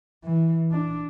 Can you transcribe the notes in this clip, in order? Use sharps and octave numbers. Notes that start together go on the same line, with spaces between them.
E3
D4